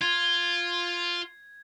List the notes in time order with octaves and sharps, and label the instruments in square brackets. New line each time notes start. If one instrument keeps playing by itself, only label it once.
[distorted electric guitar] F4 [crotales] G#6